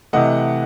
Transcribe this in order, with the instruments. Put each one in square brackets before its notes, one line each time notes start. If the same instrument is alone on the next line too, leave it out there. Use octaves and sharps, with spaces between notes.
[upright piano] C3 E3 A3 D#5 F#5